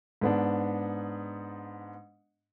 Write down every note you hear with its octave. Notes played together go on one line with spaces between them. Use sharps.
G#2 B3 D4